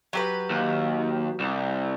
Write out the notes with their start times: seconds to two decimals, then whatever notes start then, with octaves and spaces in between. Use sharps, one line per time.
0.13 F#3 G4 B4
0.50 D#2
1.40 C2